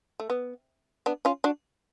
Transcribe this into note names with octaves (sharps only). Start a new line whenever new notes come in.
A3
B3
B3 D4
C#4 F4
D4 F#4